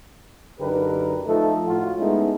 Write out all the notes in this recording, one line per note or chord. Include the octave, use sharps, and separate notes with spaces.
F#2 D3 D#4 G4 A#4 B4
F3 A3 D#4 A4
A2 F4 F#4
G#3 A3 B3 C#4 D#4 E4